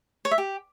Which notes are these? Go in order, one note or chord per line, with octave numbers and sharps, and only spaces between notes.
C#5
E5
G4